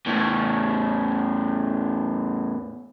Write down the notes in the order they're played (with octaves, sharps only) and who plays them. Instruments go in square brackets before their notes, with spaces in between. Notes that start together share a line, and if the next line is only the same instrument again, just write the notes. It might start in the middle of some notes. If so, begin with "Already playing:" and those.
[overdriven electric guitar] E2 A2